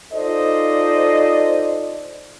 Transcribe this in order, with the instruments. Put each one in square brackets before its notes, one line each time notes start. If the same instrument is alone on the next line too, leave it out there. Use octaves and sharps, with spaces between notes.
[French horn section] D#4 F4 A4 C5 D5 D#5